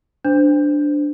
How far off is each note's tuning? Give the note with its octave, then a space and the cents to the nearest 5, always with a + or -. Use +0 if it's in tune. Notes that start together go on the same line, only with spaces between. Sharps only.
D4 +0 C5 -20